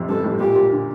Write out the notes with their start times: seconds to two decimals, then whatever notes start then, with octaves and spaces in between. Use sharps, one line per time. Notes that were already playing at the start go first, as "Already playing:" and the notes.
Already playing: F2 A2 C3 F3
0.08 G2 A4
0.24 A2
0.40 A#2 G4
0.56 A#2
0.72 D3